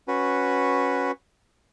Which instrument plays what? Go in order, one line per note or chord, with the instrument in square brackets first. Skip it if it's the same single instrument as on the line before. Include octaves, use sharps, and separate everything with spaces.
[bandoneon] C#4 F#4 B4